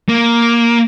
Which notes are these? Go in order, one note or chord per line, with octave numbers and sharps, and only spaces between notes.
A#3